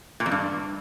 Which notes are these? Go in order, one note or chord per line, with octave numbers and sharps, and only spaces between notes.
A#2
F2
G2